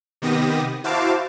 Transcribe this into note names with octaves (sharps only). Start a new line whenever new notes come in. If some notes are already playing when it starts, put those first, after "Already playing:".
C3 D#3 B3 G4 D#6 A#6
E4 F#4 C5 F5 A5 D6